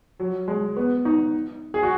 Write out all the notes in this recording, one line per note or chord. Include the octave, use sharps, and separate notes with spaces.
F#3
G#3
B3
D#4
G#4
F#4